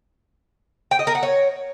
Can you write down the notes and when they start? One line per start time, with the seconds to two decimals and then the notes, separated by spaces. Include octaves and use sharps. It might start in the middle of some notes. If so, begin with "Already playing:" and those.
0.91 G5
0.99 D#5
1.07 A#4
1.15 F#5
1.23 C#5